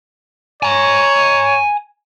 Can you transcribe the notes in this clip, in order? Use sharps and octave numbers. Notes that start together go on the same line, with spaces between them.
C#5 G#5 A#5